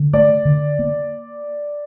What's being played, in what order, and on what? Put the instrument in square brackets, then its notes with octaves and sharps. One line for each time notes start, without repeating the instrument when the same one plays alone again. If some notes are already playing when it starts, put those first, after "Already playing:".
Already playing: [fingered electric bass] D3
[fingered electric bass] A3 [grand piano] D5
[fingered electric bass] D3
A#3